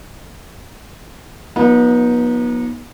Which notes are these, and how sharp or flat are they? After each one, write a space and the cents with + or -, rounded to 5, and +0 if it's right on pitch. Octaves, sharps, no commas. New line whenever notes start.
F3 +45 B3 -35 D#4 +0